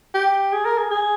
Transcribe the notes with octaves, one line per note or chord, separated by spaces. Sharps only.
G4
G#4
A#4
G#4
G#4